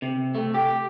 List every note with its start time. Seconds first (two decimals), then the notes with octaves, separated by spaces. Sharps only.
0.02 C3
0.34 A3
0.54 G4